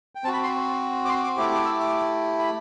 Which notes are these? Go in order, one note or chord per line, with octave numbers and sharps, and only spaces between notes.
G5
C4 F#4 A5
B5
C6
D6
C6
D6
A3 E4 G4 D6
D6
E6
D6
B5